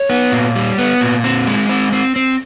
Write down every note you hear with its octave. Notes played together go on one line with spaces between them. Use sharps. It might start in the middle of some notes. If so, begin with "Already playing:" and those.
Already playing: C#5
B3
A#2
G3
B3
A#2
C4
G#3
C4
C4
C4